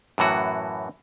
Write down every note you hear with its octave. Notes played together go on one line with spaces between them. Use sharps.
F#2 A2 E3 F#4